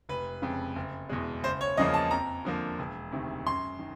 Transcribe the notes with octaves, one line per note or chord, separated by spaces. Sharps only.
F1 B4
F2 C#3
F#1
E2 B2 G#3
F#1 C5
C#5
E2 C#3 F3 A#3 D#5
A5
F2 A#5
D3 F3 A#3
E1
D2 C3 D#3
F#2 C6
D#3